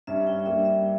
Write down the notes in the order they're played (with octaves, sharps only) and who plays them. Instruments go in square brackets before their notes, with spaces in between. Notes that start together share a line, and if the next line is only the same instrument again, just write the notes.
[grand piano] G2 G3 C#4 [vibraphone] E5
[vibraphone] G5
G5
[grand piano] G2 G3 A#3 [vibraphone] E5
[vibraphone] E5